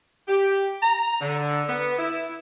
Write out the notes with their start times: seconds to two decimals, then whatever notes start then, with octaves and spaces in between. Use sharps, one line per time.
0.28 G4
0.82 A#5
1.21 D3
1.69 B3
1.98 E4